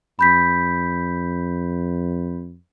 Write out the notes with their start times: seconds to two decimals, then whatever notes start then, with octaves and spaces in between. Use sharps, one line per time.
0.19 F2 B5 G6 B6